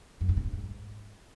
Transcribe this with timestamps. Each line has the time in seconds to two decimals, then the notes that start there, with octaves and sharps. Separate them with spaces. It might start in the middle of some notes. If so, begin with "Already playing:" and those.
0.21 F#2
0.29 G2
0.37 C3
0.45 G2
0.53 G#2